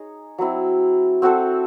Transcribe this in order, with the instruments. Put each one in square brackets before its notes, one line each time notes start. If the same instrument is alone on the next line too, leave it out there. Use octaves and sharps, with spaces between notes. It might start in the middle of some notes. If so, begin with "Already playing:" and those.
Already playing: [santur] D#4 G#4 C#5
F#3 C4 E4
C4 F#4 A4 C5